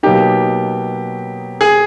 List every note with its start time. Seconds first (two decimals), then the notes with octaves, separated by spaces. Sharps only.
0.03 B2 F#3 A#3 D#4 G4
1.61 G#4